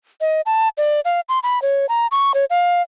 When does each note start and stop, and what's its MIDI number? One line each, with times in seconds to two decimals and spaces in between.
0.21 0.41 75
0.46 0.68 81
0.78 1.00 74
1.05 1.20 77
1.29 1.39 84
1.43 1.62 83
1.62 1.86 73
1.89 2.07 82
2.12 2.32 85
2.34 2.45 73
2.50 2.82 77